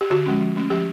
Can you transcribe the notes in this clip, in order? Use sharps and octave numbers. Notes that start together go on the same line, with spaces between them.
G4
D3 F#4
F3 G#3 C#4
F3
A3 C#4
F3 G4